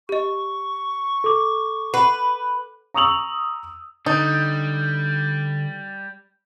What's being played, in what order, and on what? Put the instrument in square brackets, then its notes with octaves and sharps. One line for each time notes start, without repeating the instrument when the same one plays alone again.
[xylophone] G4 D#5 [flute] C#6
[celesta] A4 D6
[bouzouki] B4 [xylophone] F#5
[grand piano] A#5 C#6 D#6 E6 F7 F#7
[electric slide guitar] D3 [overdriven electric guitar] G3 [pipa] D#4